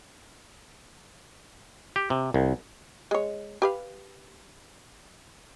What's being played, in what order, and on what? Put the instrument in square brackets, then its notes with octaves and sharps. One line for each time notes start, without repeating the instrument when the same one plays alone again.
[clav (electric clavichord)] G4
C3
C2
[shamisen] G#3 C#5
G4 B4 F5